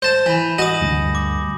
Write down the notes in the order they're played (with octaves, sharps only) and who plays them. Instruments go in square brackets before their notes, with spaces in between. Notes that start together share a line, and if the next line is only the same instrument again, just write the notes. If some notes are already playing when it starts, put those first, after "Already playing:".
[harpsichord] C5 A5 [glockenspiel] G6 E7
[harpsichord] E3 [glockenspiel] G#5 B5
[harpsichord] F#4 D#5 [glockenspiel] D#6 A#6 F#7
[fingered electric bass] D2 G2
[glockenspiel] D6